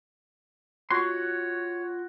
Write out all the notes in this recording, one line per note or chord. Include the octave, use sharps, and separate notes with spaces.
F4 F#4 C#5 C6